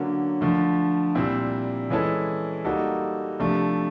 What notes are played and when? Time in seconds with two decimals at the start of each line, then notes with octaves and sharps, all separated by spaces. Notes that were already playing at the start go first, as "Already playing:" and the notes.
Already playing: D3 F#3 A#3 C#4
0.41 D3 F3 A3
1.15 A#2 G3 C4 E4
1.90 E3 G#3 C#4 E4 A4
2.65 G3 A#3 D#4 F#4 A4
3.39 C3 F3 A3 D4